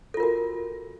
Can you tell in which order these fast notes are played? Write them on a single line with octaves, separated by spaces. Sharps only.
A4 F4 A#4 F#4